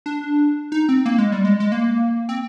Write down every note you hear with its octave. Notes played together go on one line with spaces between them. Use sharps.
D4
D#4
C4
A#3
G#3
G3
G#3
G#3
A#3
C4